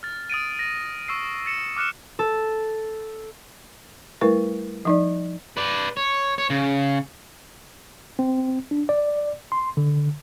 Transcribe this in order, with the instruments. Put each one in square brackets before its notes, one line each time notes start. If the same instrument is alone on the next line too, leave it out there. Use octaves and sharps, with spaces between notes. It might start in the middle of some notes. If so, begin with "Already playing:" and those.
[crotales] F6 A6
D#6 A6 D7 D#7
A#6
C#6 E6 C7
A6 C7 C#7 E7
D6 F6 F#6 C#7 E7
[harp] A4
[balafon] G3 A3 E4 A#4 B4
F3 D#4 D5
[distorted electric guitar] B4 D5
C#5
C#5
C#3
[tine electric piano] C4
D4
D5
C6
D3